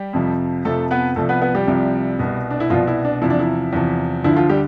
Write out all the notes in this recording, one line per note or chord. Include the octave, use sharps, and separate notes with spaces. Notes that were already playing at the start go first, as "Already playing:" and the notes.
Already playing: G3 G4
F2 C3 F3
F2 C3 F3 A3 A4
B3 B4
C2 C3 F3 A3 A4
B3 B4
B3 B4
G3 G4
C2 C3 F3
C2 B2
D4
E4
C2 B2 F3 F4
E4
D4
E2 C3 F3 E4
D4
E4
E2 C3 F3
D2 D3 F3 E4
F3 F4
G3 G4